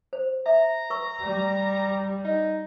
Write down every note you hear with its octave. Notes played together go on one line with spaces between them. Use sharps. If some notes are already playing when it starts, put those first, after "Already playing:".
C5
E5 A#5
B4 C#6 E6
G3
D#4